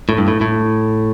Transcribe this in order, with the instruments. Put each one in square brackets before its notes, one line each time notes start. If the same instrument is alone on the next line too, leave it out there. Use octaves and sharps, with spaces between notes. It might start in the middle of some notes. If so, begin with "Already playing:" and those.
[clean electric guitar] A2
G2
A2
A2